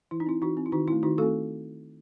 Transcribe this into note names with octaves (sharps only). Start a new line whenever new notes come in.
E3 E4
D#4
C4 E4
E3 D#4 F#4
C4
E4
D#3 D#4 F#4
A3 C4 E4
D#3 D#4 F#4
A3 C4 F#4 A4